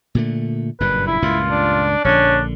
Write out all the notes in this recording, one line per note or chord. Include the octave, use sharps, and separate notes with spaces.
A#2 D3 A3
F#1 G2 A#2 B4
E4 B5
C#2 G2 A#2 F4
D4
A#1 D3 C#4 D4